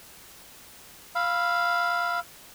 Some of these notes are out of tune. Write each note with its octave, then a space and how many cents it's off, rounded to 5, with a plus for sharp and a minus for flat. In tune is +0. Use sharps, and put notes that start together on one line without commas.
F5 +0 B5 +0 E6 +10